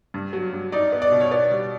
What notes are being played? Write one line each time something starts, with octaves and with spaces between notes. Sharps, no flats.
G2
F#3
G2
D#4 D5
B3
D5
B2
C#5
B3 D5
G3